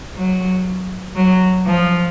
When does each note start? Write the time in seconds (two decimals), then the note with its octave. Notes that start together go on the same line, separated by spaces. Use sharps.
0.15 F#3
1.16 F#3
1.66 F3